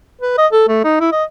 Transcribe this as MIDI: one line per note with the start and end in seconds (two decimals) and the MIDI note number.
0.21 0.34 71
0.38 0.47 75
0.52 0.65 69
0.68 0.82 57
0.84 0.97 63
1.00 1.10 64
1.12 1.24 75